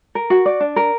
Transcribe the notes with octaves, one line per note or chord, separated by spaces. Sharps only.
A#4
F#4
D5
D4
A#4